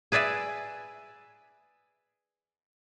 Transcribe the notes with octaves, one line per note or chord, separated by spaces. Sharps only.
G#4 B4 D5 E5 G#5